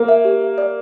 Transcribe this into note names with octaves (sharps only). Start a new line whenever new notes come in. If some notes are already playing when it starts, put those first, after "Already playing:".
Already playing: A#3
E5
G4
E5
D5